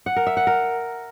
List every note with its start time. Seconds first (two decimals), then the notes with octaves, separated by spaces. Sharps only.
0.06 F#5
0.16 A#4
0.27 E5
0.37 F#5
0.47 A#4